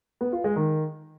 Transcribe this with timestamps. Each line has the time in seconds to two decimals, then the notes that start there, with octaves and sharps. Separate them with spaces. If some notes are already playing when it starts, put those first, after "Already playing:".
0.21 B3
0.32 F4
0.44 G#3
0.56 D#3